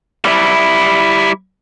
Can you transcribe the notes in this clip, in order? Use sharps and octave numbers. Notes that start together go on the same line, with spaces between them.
G3 E4